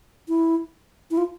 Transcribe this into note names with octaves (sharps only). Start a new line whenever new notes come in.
E4
E4
F4